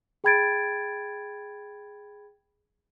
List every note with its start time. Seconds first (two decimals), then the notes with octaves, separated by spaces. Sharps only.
0.24 G#4 G5 B5 G#6 A6 D7